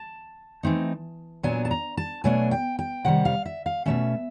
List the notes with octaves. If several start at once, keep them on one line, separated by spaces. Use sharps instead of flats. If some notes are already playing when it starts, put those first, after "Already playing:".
Already playing: A5
E3 A3 C4 D#4
A#2 F#3 B3 D4 G#5
A5
A#5
A5
B2 F#3 A3 D4 G#5
G5
G5
C3 D#3 G3 F#5
F5
E5
F5
B2 F#3 A3 C#4 E5